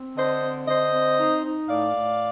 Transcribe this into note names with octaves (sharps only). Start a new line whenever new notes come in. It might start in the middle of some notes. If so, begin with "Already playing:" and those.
Already playing: C4
D3 C5 D#5
C4
D3 C5 D#5
C4
D#4
D#4
A2 D5 F5
A2